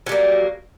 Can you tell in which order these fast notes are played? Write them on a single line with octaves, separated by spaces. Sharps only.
F#3 G3 A#3